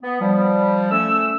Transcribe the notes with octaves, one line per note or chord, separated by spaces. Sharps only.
B3
F3 G3
A3 C#4 E6